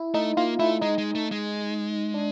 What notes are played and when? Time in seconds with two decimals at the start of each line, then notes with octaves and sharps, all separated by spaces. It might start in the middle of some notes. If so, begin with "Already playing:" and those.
Already playing: E4
0.14 A3 D#4
0.37 A#3 F4
0.60 A3 E4
0.81 G#3 D#4
0.98 G#3
1.15 A3
1.32 G#3
2.14 D4